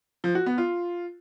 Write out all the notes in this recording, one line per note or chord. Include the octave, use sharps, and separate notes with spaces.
F3
F#4
B3
F4